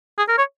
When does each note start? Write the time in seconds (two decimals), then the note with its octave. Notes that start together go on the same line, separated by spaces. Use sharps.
0.18 G#4
0.28 A#4
0.38 C#5